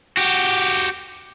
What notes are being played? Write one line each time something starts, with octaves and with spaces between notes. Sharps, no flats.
F#4 G4